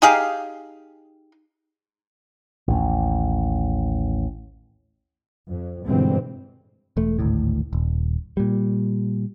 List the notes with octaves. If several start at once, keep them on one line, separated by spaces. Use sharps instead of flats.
D#4 G4 G#4 F5
A1 D#2
F2
G1 B2 D3 E3 G#3 C4
E1 A3
G#1 D2 A2
D#1
A#2 G3